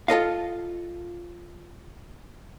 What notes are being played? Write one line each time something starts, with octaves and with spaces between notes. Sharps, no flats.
F4 A4 D#5 F5